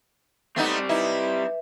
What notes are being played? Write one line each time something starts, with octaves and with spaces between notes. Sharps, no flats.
G3 A3 B3 C4 D#4
D#4 E4 B4 E5